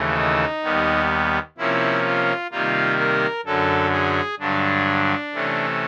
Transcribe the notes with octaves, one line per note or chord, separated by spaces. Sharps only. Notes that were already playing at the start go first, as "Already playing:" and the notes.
Already playing: D#2 C#3 E3 A3
D#4
D#2 D#3 G3 B3
C3 F3 A#3 C#4 E4
F4
C3 D#3 G3 A#3 F4
A#4
F#2 D3 F#3 A4
G#4
G2 D3 F#3 D4
C3 E3 A3 C#4